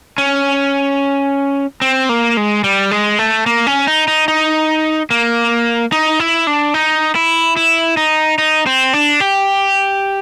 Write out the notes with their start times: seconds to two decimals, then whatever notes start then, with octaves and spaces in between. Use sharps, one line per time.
0.18 C#4
1.82 C4
2.09 A#3
2.37 G#3
2.64 G3
2.91 G#3
3.19 A3
3.46 A#3
3.67 C#4
3.87 D#4
4.08 D#4
4.28 D#4
5.10 A#3
5.92 D#4
6.20 E4
6.47 D4
6.74 D#4
7.15 E4
7.57 E4
7.97 D#4
8.38 D#4
8.66 C4
8.93 D4
9.20 G4